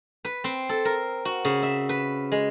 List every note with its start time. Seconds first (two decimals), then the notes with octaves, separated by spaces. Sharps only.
0.25 B4
0.44 C4
0.69 A4
0.85 A#4
1.25 F#4
1.45 C#3
1.63 E5
1.89 B4
2.32 G#3